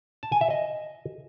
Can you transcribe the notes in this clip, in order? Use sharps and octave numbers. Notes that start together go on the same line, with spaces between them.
A5
G#5
E5
D#5